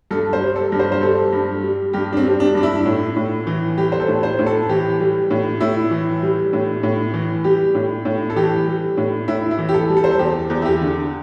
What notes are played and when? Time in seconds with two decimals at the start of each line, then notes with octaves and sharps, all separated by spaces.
0.11 G2 A4
0.33 C5
0.41 G3
0.56 A4
0.72 G2
0.79 C5
0.92 C5
1.02 G3 A4
1.33 G2
1.63 G3
1.93 G2 G4
2.12 D4
2.17 C4
2.24 G3
2.40 D4
2.55 G2 D4
2.63 E4
2.85 A2
3.16 A2
3.47 E3
3.77 G3 G4
3.92 C5
4.00 A4
4.08 A2
4.23 C5
4.39 A2
4.46 A4
4.69 E3 G4
5.00 G3
5.30 A2
5.60 A2 E4
5.91 E3
6.23 G3
6.53 A2
6.83 A2
7.14 E3
7.44 G3 G4
7.75 A2
8.05 A2
8.30 A4
8.36 E3 G4
8.67 G3
8.97 A2
9.28 A2 E4
9.51 E4
9.58 E3
9.69 G4
9.74 A4
9.89 G3
9.97 A4
10.04 C5
10.11 A4
10.19 E2 G4
10.50 E2
10.62 E4
10.65 G4
10.81 D3